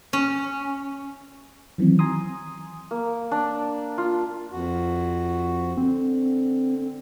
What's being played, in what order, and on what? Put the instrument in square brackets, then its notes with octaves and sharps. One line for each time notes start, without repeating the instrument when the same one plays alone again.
[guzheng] C#4
[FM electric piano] D#3 E3 F#3 C4
G#5 A#5 C6 D#6
[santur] A#3
D4
F4
[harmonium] F2 F#4
[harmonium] D3 [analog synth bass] C4